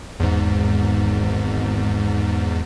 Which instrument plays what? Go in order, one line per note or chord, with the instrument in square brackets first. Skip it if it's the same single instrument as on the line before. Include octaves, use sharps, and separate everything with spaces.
[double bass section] G#1 [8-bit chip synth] E2 G#2